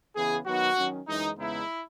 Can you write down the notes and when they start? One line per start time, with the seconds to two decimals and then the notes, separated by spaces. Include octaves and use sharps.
0.15 C#3 E3 B3 G#4
0.45 D#3 F#3 B3 D#4 F#4
0.76 D#3 F#3 C#4
1.07 F#2 E3 G#3 D#4
1.37 E2 C#3 G#3 B3 D#4 E4